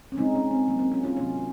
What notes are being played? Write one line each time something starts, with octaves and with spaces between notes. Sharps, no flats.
C#4
C#3 G#3 C4 D#4
C#4
C4
C#3 F#3 A#3
C4
C#4
C#4 F4
C3 D#3 F#3 A#3 C#4